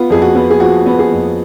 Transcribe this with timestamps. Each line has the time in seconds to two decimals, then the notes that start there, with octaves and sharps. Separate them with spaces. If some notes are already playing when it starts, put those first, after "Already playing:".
Already playing: B3 F4
0.10 F2 G#4
0.22 F#4
0.35 B3
0.50 G#4
0.60 F3 F#4
0.86 B3
0.99 G#4
1.12 F2